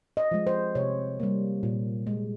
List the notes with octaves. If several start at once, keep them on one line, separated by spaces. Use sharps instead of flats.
D#5
F3 G#3
C5
C3 C#5
G3 A#3
A#2
G#3